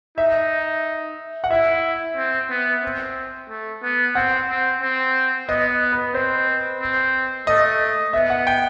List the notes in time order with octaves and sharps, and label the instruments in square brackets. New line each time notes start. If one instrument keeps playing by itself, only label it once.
[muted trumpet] D#4 [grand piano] E5
[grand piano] F#5
[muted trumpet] E4 [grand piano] E5
[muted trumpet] C4
B3
C4
A3
B3
[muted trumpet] C4 [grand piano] F#5
[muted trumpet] C4
C4
[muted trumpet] B3 [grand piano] D#5
[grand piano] B4
[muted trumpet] C4 [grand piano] C5
[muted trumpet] C4
[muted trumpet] A3 [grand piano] D#5
[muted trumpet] B3 [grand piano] E5
[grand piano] F#5
G5